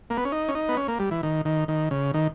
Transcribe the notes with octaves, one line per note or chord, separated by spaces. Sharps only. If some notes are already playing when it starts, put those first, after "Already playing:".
A#3
B3
C#4
D#4
C#4
D#4
B3
C#4
A#3
G3
E3
D#3
D#3
D#3
C#3
D#3